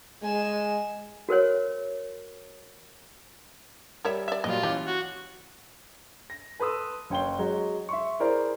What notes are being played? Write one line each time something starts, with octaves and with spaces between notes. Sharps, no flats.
G#3 G#5 E7
F#4 A#4 C5 C#5
G3 A#4 C#5 E5
D5 E5
A#2 F#3 G3 F4 D#5
E3 C#4 G4
F#4
A#6
A4 B4 C6 D#6 E6
F#1 C#5 G5 C6 G7
F#3 G#3
E5 C6 C#6
E4 G#4 A#4 C5 D5